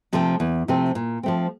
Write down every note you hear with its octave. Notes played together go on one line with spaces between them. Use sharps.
C3 F3 A3 C4
E2
C3 F3 A3 C4
A#2
F3 A3 C4